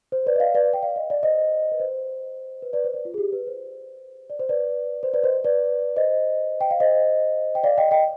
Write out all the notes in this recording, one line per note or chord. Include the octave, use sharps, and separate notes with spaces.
C5
B4 D5
D#5
D5 F5
B4 D5
G5
D5 F5
D#5
D5
C5 D#5
B4
C5
B4
B4 D5
C5
B4 D5
F4
G#4
G4
B4
C5
D5
C5
B4 D5
C5
B4 D5
C5 D#5
B4 D5
C5 D#5
G5
F5
C5 D#5
G5
D5 F5
D#5 G5
D#5 G5